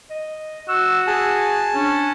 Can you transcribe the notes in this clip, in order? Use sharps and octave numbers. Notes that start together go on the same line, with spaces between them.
D#5
F#4 E6
G#4 G#5 A5
C#4 D4